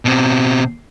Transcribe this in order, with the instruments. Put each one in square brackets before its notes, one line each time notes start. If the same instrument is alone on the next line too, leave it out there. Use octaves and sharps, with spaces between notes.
[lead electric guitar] B2 C4